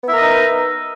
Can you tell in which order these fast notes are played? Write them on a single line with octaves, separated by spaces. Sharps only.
B3 E5 A#4 D#5 D#4